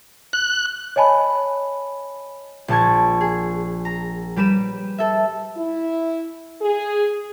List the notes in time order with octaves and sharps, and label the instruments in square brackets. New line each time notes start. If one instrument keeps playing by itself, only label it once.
[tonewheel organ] F#6
[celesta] C#5 D#5 G#5 A5 B5
[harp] A#1 F3 A5 C#6 G#6
G#4
A#5
G3 G4 B4 E7
A4 E5
[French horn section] E4
G#4